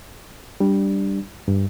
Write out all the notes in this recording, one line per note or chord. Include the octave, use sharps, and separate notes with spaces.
G3 D4
G2